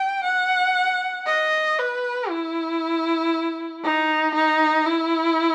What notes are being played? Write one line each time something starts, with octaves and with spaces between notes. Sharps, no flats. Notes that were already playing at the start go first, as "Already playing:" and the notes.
Already playing: G5
F#5
D#5
B4
E4
D#4
D#4
E4